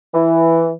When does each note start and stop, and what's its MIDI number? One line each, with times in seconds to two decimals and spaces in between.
0.14 0.70 52